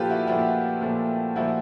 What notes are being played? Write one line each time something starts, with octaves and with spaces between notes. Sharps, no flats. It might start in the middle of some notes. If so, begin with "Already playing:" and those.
Already playing: A#2 F3 A3 F4 G4 A4 B4
E4 F#4
A#2 F3 A3 E4 F#4
A#2 F3 A3
A#2 F3 A3 E4 F#4